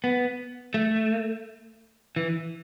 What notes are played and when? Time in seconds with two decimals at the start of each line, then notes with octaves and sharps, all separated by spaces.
0.04 B3
0.74 A3
2.16 E3